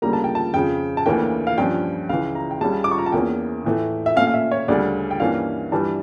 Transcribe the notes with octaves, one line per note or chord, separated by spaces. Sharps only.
D2 C#3 G3 A#3 A#5
A5
G5
A5
F2 C#3 F3 G5
A5
D2 C#3 E3 A#3 C#4 G5
F5
G2 F3 C#4 G5
C#2 C#3 E3 F5
A#5
G5
C#2 C#3 G3 C#4 A5
D6
C#6
A#5
A5
E2 E3 A#3 C#4 G5
A2 E3 A3
E5
A#2 A3 C#4 F5
F5
E5
C#5
D2 C#3 G3 C#4 D5
G5
G2 E3 A#3 C#4 F5
G2 E3 G3 A5